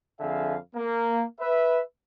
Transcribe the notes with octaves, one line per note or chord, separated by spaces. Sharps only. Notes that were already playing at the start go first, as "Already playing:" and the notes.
F2 D3 G#4 E5 F5
A#3
B4 E5